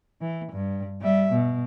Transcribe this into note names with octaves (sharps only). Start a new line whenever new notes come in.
E3
G2
G3 E5
B2